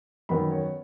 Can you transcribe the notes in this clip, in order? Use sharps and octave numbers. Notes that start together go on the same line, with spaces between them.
F#2 D#3 B3 B5
C#5